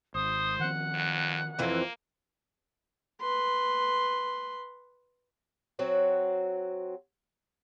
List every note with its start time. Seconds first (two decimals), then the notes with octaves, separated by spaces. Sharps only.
0.15 G#1 C5 D#6
0.59 D#3 F3 C4 F#5
0.94 F2
1.59 F2 E3 A#3
3.21 B4 C6
5.79 F#3 C4 F#4